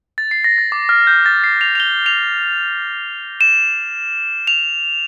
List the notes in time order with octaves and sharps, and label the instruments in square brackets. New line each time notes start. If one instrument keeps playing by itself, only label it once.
[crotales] A6
C7
A#6
A6
D6
F6
G6
A6
C7
F7
F7
G7
F7
E7
F7